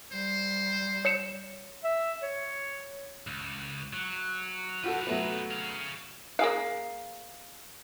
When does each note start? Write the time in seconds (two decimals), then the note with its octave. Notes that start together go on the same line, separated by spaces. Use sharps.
0.12 G3 C5
1.05 C#5 C#7 E7
1.84 E5
2.22 C#5
3.27 C#2
3.93 F#3
4.84 D#4 F4 F#4 A4 B4
5.07 F#3 A3 B3
5.51 G#4 F5
6.39 A#3 G#4 F5